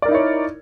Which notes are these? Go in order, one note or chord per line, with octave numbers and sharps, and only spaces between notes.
D#4 E4 A#4 C#5 D5